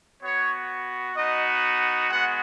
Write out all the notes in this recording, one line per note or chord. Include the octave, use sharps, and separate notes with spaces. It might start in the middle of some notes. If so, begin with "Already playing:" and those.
B3 F#4 C#5
B3 D#4 F#4 D#5
G#3 B3 F#4 F#5